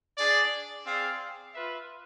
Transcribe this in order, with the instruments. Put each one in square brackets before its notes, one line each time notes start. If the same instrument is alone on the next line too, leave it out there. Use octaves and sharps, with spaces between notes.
[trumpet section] D4 G#4 D5
C4 G#4 D5 F5
F4 B4 E5